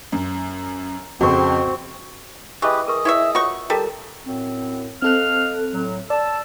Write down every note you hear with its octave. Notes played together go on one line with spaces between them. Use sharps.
F#2
F2 C#3 C4 F#4 C#6
E3 G4 G#4 B4 D#5 C#6
G#4 A#4 B4 D#5 C#6
E4 C#5 E5
F4 F#4 C#5 C#6
G3 A4 A#4 A5 A#5
F#2 A2 C4
C4 A4 D#5 F5 F6 F#6
A2 F#3
D5 A5 E6